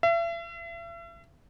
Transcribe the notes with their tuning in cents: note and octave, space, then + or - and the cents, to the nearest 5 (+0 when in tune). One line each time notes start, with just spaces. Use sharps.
E5 +40